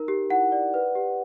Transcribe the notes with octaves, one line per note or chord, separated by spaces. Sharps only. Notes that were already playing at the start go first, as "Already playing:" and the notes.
Already playing: D#4 A#4
G4
E4 F#5
D5
B4
G4